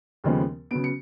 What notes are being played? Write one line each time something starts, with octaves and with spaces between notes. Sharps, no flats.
D#2 C#3 F3 G#3 B3
C#3 F#3 B3 D7
C#7